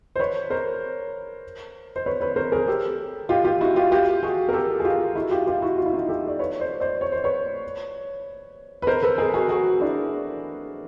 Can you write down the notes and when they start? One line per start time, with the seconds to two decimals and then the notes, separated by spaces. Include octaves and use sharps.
0.16 C5
0.19 B4 C#5
0.50 A#4 C5
1.96 C5
2.06 B4 C#5
2.21 B4 C#5
2.36 A#4 C5
2.52 G#4 A#4
2.68 G4 A4
3.29 F4 G4
3.44 F4 G4
3.61 E4 F#4
3.76 F4 G4
3.92 F4 G4
4.23 F#4 G#4
4.49 A#4
4.53 G4 A4
4.80 G#4
4.85 F4 G4
5.15 E4 F#4
5.31 F4 G4
5.47 F4 G4
5.62 E4 F#4
5.78 F4
5.86 E4
5.93 D#4 F4
6.08 G4 A4
6.28 D5
6.39 B4 C#5
6.60 C5 D5
6.80 C5 D5
7.01 C#5
7.12 C5
7.24 B4 C#5
8.82 B4
8.87 A#4 C5
9.03 A4 B4
9.18 G#4 A#4
9.34 F#4 G#4
9.49 F#4 G#4
9.81 D4 E4